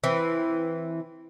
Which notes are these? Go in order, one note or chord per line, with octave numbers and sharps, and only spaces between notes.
E3 C4